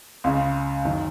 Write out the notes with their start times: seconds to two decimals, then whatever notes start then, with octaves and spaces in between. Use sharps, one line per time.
0.24 C#2 C#3
0.85 F#1 F#2 D#3